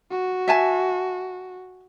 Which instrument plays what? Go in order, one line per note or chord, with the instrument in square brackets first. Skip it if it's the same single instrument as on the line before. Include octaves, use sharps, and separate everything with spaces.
[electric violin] F#4
[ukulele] E5 G#5 A5